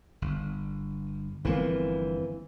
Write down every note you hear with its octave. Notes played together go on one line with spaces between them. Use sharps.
G1
G1 E3 F3 A#3 C4